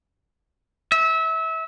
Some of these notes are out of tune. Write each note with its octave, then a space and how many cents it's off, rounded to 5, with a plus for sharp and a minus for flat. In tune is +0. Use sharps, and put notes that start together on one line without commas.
E5 -25